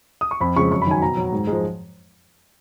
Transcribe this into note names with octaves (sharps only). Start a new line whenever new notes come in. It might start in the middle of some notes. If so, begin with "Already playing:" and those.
D#6
C#6
F2 B5
C#3 F3 G#3 C#6
F#2 C#6
B5
D#3 F#3 G#5
B2 A#5
F#3
G#2
G#3
F3